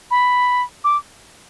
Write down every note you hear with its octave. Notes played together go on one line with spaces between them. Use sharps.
B5
D6